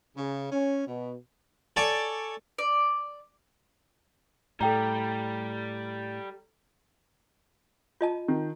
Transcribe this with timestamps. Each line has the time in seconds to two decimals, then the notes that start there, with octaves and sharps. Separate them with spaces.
0.17 C#3
0.52 C#4
0.87 B2
1.76 A4 C#5 D5 G#5 A5
2.58 D5
4.61 A2 G3 A4 G5 A#5
8.01 F4 D#5 A5
8.28 D#3